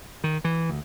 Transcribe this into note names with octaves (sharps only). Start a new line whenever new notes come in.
D#3
E3
D2